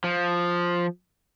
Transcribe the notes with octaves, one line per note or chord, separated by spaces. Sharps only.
F3